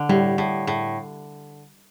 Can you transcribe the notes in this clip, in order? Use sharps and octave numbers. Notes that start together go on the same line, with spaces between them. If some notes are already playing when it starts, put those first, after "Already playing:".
Already playing: D3
A2 G3
A2
A2